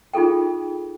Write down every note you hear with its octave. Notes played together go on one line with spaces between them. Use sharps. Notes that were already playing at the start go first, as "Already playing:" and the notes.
D#4 F4 G#4 A4 G5